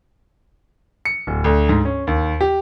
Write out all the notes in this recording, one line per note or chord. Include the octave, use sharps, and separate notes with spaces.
C#7
D1
D2
G#2
C#4
D#2
G4